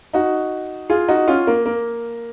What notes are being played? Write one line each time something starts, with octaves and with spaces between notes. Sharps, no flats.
D#4 F#4
F4 G#4
D#4 F#4
C#4 F4
A#3
A#3